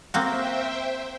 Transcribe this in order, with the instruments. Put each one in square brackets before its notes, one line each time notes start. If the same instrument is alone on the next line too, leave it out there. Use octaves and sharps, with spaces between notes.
[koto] A#3 C4 F#4 [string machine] C5 E5 G5